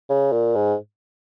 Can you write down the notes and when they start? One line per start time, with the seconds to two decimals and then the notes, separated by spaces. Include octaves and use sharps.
0.09 C#3
0.32 A#2
0.55 G#2